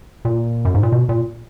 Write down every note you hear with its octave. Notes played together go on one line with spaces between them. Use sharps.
A#2
F#2
G#2
A#2
B2
A#2